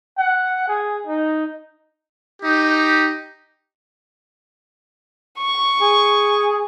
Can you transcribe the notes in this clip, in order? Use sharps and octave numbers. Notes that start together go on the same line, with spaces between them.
F#5
G#4
D#4
D#4 G4
C#6
G#4